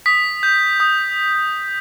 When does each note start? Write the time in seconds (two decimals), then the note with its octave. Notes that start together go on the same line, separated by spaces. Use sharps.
0.06 D#6 B6
0.43 G6
0.80 D#6